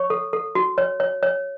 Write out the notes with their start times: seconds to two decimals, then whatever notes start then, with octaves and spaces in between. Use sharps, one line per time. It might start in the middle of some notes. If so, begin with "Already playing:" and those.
Already playing: C#5 C#6
0.10 A4
0.33 A4
0.55 F#4
0.78 C#5
1.00 C#5
1.23 C#5